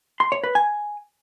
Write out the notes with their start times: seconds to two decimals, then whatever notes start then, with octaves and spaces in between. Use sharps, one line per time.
0.20 C6
0.32 C#5
0.44 B4
0.55 G#5